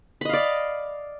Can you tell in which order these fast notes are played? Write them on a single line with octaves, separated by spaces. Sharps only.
B5 D#5 F5 D5